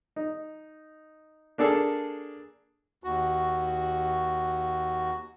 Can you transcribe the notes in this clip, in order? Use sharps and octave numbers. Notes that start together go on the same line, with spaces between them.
D#4
A#3 D4 G#4 A4
D#2 F#4